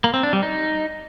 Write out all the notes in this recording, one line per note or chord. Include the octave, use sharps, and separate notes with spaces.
A#3
C4
D4
G3
D#4